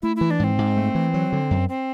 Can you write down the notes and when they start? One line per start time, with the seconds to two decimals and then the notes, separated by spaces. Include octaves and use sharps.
0.02 A3 E4
0.16 E3 E4
0.31 D4
0.39 G#2 C4
0.58 G#2
0.77 A3
0.95 E3
1.14 F#3
1.32 D3
1.51 F#2
1.69 C4